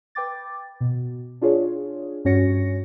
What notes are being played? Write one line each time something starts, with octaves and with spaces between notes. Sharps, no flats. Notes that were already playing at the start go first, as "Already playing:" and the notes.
B4 G5 D6 A6
B2
D4 F4 G#4 C#5
G2 C#4 F#4 C#5 A#6 C#7